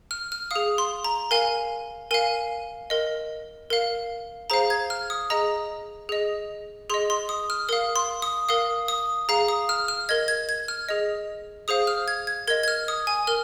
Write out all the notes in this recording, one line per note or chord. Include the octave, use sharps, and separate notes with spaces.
F6
F6
G#4 F5 D#6
C6
A#5
A#4 F5 G#5
A#4 F5 G#5
A#4 D#5
A#4 F5
G#4 C5 F5 A#5
G#6
F6
D#6
G#4 D#5 A#5
G#4 D#5
G#4 D#5 C6
C6
D#6
F6
A#4 F5 D#6
C6
D#6
A#4 F5 D#6
D#6
G#4 F5 A#5
D#6
F6
F6
A#4 D#5 G#6
G#6
G#6
F6
G#4 D#5
G#4 C5 F5 D#6
F6
G#6
G#6
A#4 D#5 G#6
G#6
F6
D#6
G#5
A#4 F6